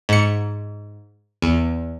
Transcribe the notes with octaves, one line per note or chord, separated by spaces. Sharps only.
G#2 C#7
E2